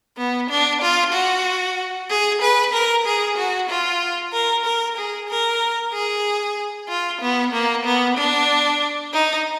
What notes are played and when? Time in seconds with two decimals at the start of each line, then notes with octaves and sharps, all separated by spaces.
0.17 B3
0.50 D4
0.81 F4
1.13 F#4
2.09 G#4
2.41 B4
2.73 A#4
3.06 G#4
3.37 F#4
3.69 F4
4.33 A#4
4.65 A#4
4.97 G#4
5.29 A#4
5.93 G#4
6.89 F4
7.21 B3
7.53 A#3
7.85 B3
8.17 D4
9.13 D#4